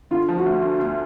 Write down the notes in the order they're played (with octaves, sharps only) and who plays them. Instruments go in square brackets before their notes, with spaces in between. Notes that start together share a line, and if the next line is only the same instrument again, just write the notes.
[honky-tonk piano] D3 [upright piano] F4
[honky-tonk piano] F3
[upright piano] F#4
[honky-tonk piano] D2
D3
D2